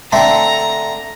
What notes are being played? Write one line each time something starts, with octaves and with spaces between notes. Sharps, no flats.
D3 A3 C4 A#5